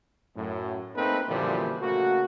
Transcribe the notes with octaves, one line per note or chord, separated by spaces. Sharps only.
F#2 A2
A3 A#3 C4 D#4 A4 B4
F#2 A#2 D3 E3 F3 G3
C#3 A3 A#3 F#4